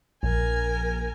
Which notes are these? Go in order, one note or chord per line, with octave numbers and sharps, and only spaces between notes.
A#1 A#4 G#5